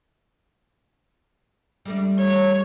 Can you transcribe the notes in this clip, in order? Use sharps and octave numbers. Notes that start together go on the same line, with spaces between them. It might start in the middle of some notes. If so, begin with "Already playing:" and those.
G3 A3 D4
C#5